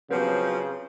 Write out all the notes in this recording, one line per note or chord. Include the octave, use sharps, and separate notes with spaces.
C#3 F3 F#3 B3 C4 G4